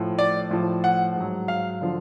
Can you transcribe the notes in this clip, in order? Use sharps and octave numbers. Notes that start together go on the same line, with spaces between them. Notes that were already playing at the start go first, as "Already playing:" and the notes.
Already playing: A2 F3
D5
A2 F3
F#5
G#2 F#3
F5
D3 F3